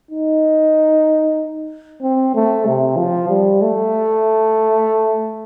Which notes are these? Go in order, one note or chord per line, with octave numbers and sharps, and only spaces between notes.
D#4
C4
A3
C3
F3
G3
A3